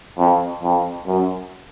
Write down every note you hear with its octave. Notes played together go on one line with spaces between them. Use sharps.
F2
F2
F#2